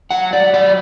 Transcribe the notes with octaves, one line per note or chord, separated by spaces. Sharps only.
F#3 F#5
D5
F#3 D5